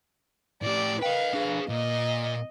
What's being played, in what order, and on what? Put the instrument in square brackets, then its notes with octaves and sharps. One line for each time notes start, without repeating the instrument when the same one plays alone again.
[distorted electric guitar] A2 G4 [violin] D5
[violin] B4 F5 [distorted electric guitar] D#5 G5
[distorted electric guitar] D4 G#4
[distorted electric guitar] A#2 [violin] D#5